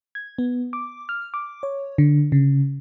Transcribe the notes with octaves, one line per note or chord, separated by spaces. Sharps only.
G#6
B3
D6
F6
D6
C#5
D3
C#3